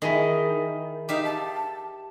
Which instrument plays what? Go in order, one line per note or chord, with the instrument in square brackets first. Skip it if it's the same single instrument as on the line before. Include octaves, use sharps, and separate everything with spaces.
[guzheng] D#3 [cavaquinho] E4 G#4 D#5
[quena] D#4 [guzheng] G4 E5 F5
[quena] A5